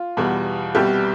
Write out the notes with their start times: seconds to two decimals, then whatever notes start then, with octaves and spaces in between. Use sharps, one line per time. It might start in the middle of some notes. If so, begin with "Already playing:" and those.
Already playing: F4
0.17 E2 B2 G3
0.75 C2 B2 G3 G4